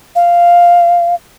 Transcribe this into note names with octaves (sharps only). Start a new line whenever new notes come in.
F5